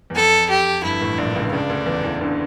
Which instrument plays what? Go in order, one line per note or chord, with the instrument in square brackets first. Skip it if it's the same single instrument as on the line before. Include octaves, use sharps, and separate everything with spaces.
[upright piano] E2
[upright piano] F2 [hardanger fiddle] A4
[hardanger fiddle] G4
[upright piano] G1 G2 [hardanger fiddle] E4
[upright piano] A1 A2
[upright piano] A#1 A#2 [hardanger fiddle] D4
[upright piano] C#2 C#3
[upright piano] C#2 C#3 [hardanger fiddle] D4
[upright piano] D2 D3
E2 E3
E2 E3
D2 D3